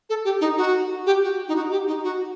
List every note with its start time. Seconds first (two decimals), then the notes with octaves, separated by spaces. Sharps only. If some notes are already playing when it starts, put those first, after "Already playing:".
0.10 A4
0.25 G4
0.41 D#4
0.58 F#4
1.06 G4
1.23 F#4
1.48 D#4
1.56 F#4
1.72 G4
1.88 D#4
2.04 F#4